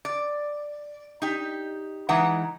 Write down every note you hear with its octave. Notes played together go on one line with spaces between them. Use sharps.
D5
D#4 G4
E3 G#3 D#4 B4 F#5